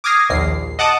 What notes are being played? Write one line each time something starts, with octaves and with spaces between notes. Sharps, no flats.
D6 D#6 F6 G#6 A#6 C7
A#1 D#2 C7
D#5 F#5 A5 D6 D#6